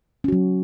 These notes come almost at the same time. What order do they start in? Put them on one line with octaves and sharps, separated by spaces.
C#4 F#4 F#3